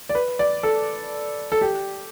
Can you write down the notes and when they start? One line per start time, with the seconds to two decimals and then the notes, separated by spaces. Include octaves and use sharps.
0.09 D5
0.15 B4
0.39 D5
0.63 A4
1.52 A4
1.61 G4